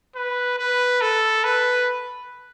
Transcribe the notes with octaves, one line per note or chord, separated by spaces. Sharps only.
B4
B4
A4
B4